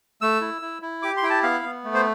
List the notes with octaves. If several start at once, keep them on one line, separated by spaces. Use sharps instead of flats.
A3 E6
E4
E4
E4
G4 D6
C6
E4 G5
A5
B3 F5
B3
A3
C5